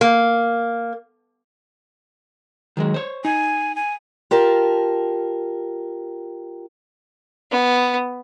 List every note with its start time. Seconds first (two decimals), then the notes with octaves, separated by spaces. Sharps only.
0.01 A#3
2.77 D#3 F#3 G#3
2.94 C5 C#5
3.25 D#4 G#5
3.76 G#5
4.31 F4 G4 A#4 A5
7.51 B3